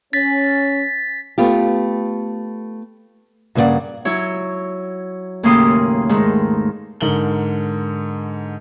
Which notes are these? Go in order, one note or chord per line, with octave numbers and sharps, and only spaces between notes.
C#4 A6 B6
A3 B3 F4 G4
G2 C#3 A#3 D4 D5 F#5
F#3 E4 C#5
D#2 A2 C#3 A#3 C6 D#6
G#2 D#3 A3
G#2 D3 A#4 F#7 G7